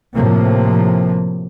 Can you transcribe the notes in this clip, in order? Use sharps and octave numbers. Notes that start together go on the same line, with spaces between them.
A2 C3 F3 A#3